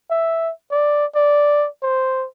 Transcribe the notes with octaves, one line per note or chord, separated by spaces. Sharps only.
E5
D5
D5
C5